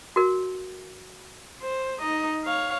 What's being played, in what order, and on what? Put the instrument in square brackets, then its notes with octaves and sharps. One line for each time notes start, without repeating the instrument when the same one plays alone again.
[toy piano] F#4 A#4
[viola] C5
D#4 D#5
C#5 F5